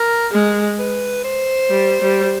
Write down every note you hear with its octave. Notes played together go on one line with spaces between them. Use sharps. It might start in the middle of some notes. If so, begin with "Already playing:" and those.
Already playing: A#4
G#3
B4
C5
G3
G3